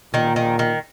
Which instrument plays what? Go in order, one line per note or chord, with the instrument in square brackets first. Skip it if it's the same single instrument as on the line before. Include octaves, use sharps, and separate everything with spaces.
[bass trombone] A#2 [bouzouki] D#3
[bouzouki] D#3
D#3